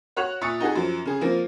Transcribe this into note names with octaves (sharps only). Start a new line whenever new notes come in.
F#4 C#5 F#6 F7
A#2 E5 C#6 D#6 A6 C#7
D#4 F#4 G#4 A4
F#2 F3
C#3 G#4
F3 A#3 C4 F4